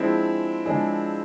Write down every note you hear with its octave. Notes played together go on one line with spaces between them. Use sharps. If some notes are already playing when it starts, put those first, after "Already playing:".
Already playing: F3 G#3 C4 D4 E4 G#4
F3 G#3 D4 G#4